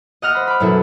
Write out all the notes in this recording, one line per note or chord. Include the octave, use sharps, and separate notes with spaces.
D#5 F#5 F6 A#6
C5 B5
B5 D6
F#2 B2 E4 F#4 A4 E5